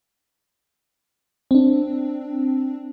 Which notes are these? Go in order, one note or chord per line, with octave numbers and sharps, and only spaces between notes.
C4 D4